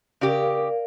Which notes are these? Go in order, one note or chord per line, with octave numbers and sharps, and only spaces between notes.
C#3 G4 A#4 D5 F5